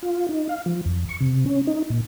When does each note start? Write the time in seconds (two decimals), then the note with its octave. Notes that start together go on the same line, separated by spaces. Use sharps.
0.02 F4
0.29 D#4
0.49 F5
0.66 F3
0.85 F2
1.09 C#6
1.21 C3
1.46 C#4
1.67 D#4
1.90 A#2